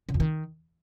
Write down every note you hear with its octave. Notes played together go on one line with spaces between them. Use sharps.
C#3
F2
D#3